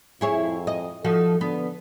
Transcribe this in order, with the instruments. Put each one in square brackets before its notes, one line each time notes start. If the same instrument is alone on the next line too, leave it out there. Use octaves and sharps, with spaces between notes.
[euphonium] F2 [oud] E4 G#4 C#5
[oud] D#5
[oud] F3 D#4 F#4 [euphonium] A4
[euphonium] D3 [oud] B3